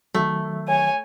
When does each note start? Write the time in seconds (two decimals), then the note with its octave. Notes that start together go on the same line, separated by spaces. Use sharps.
0.15 D#3 F#3 A3
0.68 C#5 G#5